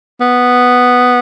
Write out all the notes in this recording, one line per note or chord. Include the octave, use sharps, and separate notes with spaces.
B3